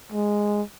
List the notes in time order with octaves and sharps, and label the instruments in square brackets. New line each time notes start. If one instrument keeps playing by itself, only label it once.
[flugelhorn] G#3